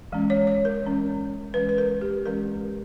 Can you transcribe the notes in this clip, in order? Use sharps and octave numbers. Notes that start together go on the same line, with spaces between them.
E3 G#3 C#4
C#5
C#5
A#4
E3 G#3 C#4
E3 G#3 C#4 B4
B4
A#4
G4
E3 G#3 C#4 A#4